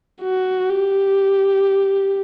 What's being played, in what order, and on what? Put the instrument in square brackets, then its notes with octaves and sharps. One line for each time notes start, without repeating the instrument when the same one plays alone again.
[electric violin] F#4
G4